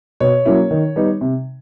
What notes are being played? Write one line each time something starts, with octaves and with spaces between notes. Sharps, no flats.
B2 C#5
F#3 A#3 C#4 E4
D#3
G3 B3 D#4
C3